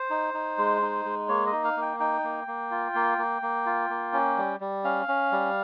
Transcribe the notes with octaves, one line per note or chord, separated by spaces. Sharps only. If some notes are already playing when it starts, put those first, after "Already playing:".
Already playing: C5
D#4
D#4
G#3
D#4
G#3
A#3 C#5
D#5
D#4
F5
A#3
G5
D#4 G5
A#3
A#3
F4
A#3
A#3
A#3
F4
A#3
C#4
G3
G3
C#4 F5
C#4
G3